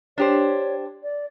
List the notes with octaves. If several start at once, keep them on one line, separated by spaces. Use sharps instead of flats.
D4 G4 C5 C#5
D5